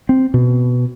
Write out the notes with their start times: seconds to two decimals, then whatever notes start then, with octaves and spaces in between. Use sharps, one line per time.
0.09 C4
0.34 B2